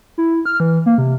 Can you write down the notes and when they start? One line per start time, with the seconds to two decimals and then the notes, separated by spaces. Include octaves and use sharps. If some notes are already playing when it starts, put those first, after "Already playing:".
0.18 E4
0.46 F6
0.60 E3
0.86 A#3
0.98 C3